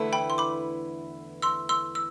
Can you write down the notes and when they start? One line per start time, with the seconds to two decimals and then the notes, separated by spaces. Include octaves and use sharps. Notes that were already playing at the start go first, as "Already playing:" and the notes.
Already playing: E2 D3 A3 E4 B4
0.13 G5 B5
0.30 C6
0.38 B5 D6
1.42 C6 E6
1.69 C6 E6
1.95 E6